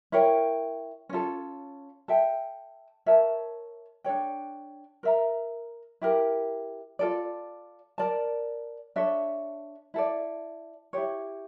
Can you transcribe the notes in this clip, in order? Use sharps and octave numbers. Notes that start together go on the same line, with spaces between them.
E4 A#4 C#5 G5
C#4 F4 A4
A4 E5 G5
A#4 C#5 E5 A5
D4 A4 C#5 G5
A#4 E5 A#5
E4 G4 A#4
F4 A4 D5
A#4 D5 A5
D4 A4 C#5 E5
E4 A4 D5
E4 G4 C#5